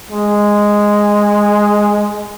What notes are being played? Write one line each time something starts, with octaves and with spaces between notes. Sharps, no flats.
G#3